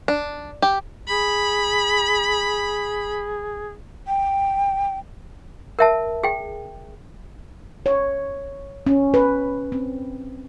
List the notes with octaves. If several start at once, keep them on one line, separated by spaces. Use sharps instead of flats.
D4
G4
G#4 B5
G5
A#4 E5 A5
G#4 G5
C#5
C#4
B4
C4